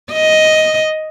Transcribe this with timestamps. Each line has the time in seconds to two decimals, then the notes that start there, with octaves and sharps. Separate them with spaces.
0.13 D#5